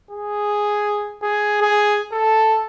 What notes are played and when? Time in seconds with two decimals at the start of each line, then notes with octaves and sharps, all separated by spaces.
0.11 G#4
1.22 G#4
1.62 G#4
2.12 A4